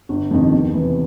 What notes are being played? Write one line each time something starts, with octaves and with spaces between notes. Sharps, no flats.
G1
F2 C3 D#3
E2
C3 E3